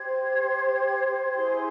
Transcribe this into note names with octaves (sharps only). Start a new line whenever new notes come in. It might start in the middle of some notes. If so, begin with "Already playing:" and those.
Already playing: G4 C5 G#6
E4 G#4 C5 C6